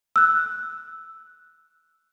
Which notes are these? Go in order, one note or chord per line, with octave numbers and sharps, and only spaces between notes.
E6 F#6